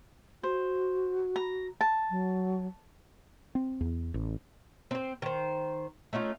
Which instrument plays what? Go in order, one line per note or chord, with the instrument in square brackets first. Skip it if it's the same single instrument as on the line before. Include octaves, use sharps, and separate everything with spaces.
[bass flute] F#4 [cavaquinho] C5
[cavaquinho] A#5
A5
[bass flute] F#3
[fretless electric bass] C4
E2
A1
[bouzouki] C4 C5
D#3 C5
A3 C#4 D#4 F4